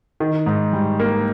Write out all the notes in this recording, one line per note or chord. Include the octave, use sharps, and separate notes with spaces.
D#3
G#2
G3
A#3